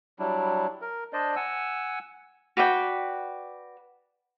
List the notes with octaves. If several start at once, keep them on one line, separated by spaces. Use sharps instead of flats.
F#3 G3 D4 E4
A#4
D4 C5 D5 D#5
F#5 G#5 E6
F#4 B4 D5 G5